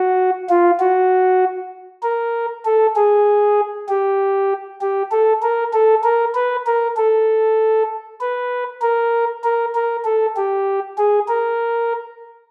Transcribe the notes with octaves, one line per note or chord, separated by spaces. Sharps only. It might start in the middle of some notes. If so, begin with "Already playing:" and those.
Already playing: F#4
F4
F#4
A#4
A4
G#4
G4
G4
A4
A#4
A4
A#4
B4
A#4
A4
B4
A#4
A#4
A#4
A4
G4
G#4
A#4